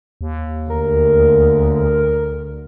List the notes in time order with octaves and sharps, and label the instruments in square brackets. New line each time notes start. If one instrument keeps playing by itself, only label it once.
[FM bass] D#2
[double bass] D2 [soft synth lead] A#4